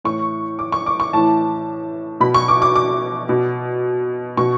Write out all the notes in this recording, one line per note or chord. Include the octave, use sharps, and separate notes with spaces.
A2 E3 C#6
D6
C#6
D6
C#6
A2 E3 A5
B2 B5
C#6
D6
D6
D6
B2
B2 C#6